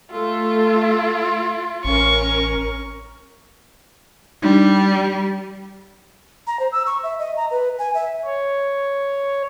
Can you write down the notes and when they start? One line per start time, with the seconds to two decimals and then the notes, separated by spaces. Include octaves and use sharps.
0.12 A3 F4 A4 E5
1.84 A1 C#4 A#4 C#6
4.42 G3 D4 D#4
6.47 A#5
6.59 C5
6.72 E6
6.86 C#6
7.03 E5
7.19 D#5
7.37 A#5
7.51 B4
7.79 G#5
7.94 E5
8.25 C#5